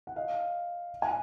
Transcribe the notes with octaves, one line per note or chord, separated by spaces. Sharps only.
F#5
D#5 F5
F#5 G#5